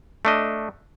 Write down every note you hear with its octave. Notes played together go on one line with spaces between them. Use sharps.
A3 D4 D#5